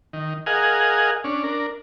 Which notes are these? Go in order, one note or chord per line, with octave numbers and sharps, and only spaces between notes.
D#3
G#4 A#4 D#5 F5 F#5 G#5
C#4 D4
D4 A#4